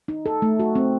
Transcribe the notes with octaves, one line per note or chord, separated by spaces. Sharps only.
D#4
A4
A3
F#4
C4